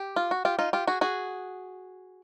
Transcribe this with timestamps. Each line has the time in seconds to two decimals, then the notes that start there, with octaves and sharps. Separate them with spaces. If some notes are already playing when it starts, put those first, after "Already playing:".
Already playing: G4
0.16 F4
0.31 F#4
0.45 F4 G4
0.59 D#4 F4
0.73 F4 G4
0.87 F#4 G#4
1.01 F#4 G#4